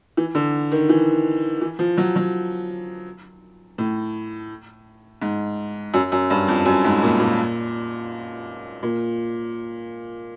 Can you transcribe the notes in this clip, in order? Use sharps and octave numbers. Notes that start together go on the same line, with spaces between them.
E3
D3
D#3
E3
E3
F3
F#3
F#3
A2
G#2
F#2
F#2
G2
F2
F#2
G#2
A#2
A#2
A#2